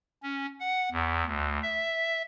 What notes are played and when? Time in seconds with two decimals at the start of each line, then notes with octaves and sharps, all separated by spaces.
0.23 C#4
0.60 F#5
0.92 E2
1.27 D2
1.62 E5